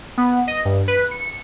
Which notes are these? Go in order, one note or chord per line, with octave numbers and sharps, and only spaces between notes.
B3
D#5
G2
B4
C#7